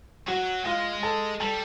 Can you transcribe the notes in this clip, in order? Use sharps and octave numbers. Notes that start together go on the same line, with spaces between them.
F#3 F#4
G#3 F4
A4
G3 A4